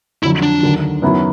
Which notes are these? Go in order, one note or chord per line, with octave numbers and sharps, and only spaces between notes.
F2 D3 F#3 E4
D4
D#2 D3 F#3
F#2 D#3 F#3 B3 E4